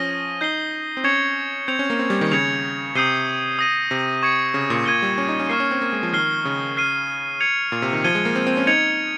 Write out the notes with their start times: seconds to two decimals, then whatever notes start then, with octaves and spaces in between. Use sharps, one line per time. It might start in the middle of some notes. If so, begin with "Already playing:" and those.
Already playing: F3 C#4 D#6 A#6 D#7 G7
0.41 D#4 G6 C7 G7
0.97 C4
1.04 C#4 C#6 G#6 C#7 F7
1.68 C4 G6 C#7 F7
1.79 C#4
1.90 A#3
1.99 C4
2.10 G3
2.21 D#3
2.31 C#3 G#6 C#7 F7
2.95 C3 D#6 G6 C7 D#7 G7
3.59 D#6 A#6 D#7
3.91 C3
4.23 C#6 G#6 C#7
4.54 C#3
4.70 A#2
4.86 A#2 G#6 D#7 G7
5.02 G3
5.18 C#4
5.28 D#4
5.40 C#4
5.49 A#3 C#6 F6 C7
5.60 C#4
5.71 C4
5.82 A#3
5.93 G#3
6.03 F3
6.13 D#3 F6 C7 G7
6.45 C#3
6.77 F6 C7 D#7
7.40 G#6 C#7 F7
7.72 A#2
7.82 C3
7.93 D#3
8.04 F3 G#6 D#7 G7
8.15 G#3
8.25 A#3
8.36 C4
8.47 C4
8.57 C#4
8.67 D#4 G#6 C#7 F7